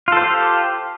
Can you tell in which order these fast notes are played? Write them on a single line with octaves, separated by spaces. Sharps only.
F4 A4 C5 G4